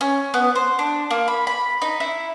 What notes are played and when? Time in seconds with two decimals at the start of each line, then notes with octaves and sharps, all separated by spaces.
0.01 C#4
0.34 B3
0.55 C5
0.79 D4
1.11 A#3
1.28 B5
1.47 B5
1.82 D#4
2.00 E4